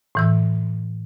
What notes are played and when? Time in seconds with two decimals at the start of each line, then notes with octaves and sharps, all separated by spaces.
0.15 A2 E3 E6